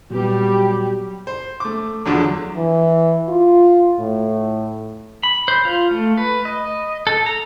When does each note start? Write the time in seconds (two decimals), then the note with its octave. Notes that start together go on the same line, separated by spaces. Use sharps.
0.10 A#2 F#3 G3 B3 G4
1.27 C5
1.60 A3 D6
2.05 E2 D3 F3 F#3
2.56 E3
3.29 F4
3.99 A2
5.23 B5
5.48 C5
5.65 F4
5.91 A3
6.18 B4
6.45 D#5
7.07 A4
7.26 A#5